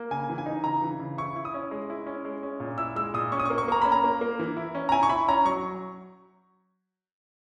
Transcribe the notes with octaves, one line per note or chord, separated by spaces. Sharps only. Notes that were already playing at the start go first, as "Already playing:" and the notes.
Already playing: A#3
C#3 G#5
E3
G#5
D#4
C#3 A#5
E3
C#3
E4 C#6
E4
D#6
C#4
G#3
E4
C#4
G#3
C#4
A#2
E4 E6
G#3 E6
A#2 D#6
C#4 C#6
D#6
C#6
A#3
C#6
A#3 A#5
C#4 B5
A#5
A#3
A#3
E3
E4
C#4
A#5
E4 G#5
C#6
E4 B5
C#4 A#5
F#3 C#6